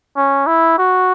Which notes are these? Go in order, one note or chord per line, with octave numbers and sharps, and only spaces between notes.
C#4
E4
F#4